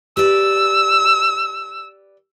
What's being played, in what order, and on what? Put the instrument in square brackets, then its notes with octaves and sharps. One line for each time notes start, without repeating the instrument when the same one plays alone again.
[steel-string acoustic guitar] G4 B4 D5 [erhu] E6